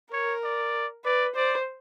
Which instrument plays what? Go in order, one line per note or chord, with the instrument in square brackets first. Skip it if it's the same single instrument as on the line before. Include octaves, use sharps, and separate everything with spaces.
[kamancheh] A#4 [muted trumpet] C#5
[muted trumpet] D5
[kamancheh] B4 [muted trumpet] D5
[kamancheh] C5 [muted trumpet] D5